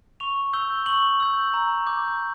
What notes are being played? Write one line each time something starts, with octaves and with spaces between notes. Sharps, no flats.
C#6 F7
E6 G6 G7
C#6 F#7
E6 G6
A#5
D6 G6